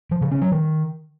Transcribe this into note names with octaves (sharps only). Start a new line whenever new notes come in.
F3
C#3
C#4
F#3
D#3